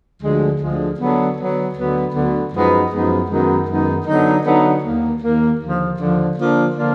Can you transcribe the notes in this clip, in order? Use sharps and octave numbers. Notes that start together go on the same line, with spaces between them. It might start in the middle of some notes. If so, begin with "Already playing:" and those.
D2 D3 F3 G#3
D2 D3 F3 G#3
D3 F#3 B3
D3 F#3 B3
D2 D3 F#3 B3
D2 D3 F#3 B3
F#2 F3 G#3 B3 D#4
F#2 F3 G#3 B3 D#4
F#2 D#3 G#3 B3 D#4
F#2 D#3 G#3 B3 D#4
D3 F#3 B3 D#4
D3 F#3 B3 D#4
D#2 D#3 A#3
D#2 D#3 A#3
D#2 D3 F3
D#2 D3 F3
D3 F3 A#3 D4 F4
D3 F3 A#3 D4 F4